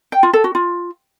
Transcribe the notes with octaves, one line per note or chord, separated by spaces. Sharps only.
G5
F4
A4
F#4
F4